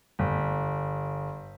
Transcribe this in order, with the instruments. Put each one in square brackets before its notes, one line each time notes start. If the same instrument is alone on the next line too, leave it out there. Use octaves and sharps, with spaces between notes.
[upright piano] G1